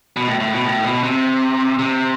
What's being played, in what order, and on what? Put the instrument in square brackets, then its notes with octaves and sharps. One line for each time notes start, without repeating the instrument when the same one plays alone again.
[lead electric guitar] B2
A2
A2
B2
A2
B2
C3
C3